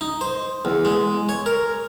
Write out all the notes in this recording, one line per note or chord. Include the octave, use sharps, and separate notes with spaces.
D#4
C5
E2
G#3
C#5
A#4